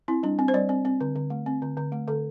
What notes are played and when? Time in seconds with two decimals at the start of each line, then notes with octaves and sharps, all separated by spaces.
0.08 C4 E4
0.23 G3 D4
0.39 C4
0.48 C5
0.54 G3 D5
0.69 C4
0.85 C4
1.01 D3
1.16 D3
1.30 A3
1.46 C4
1.62 D3
1.77 D3
1.92 A3
2.08 D3 A4